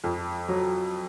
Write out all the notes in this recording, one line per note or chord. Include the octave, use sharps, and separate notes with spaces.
F2
F#3